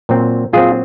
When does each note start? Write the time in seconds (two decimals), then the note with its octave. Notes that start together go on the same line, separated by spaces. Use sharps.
0.09 A#2 F#3 C4
0.53 A#2 F#3 C4 F4 G#4